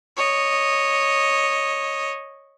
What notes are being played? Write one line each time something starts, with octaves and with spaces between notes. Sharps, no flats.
C#5 D#5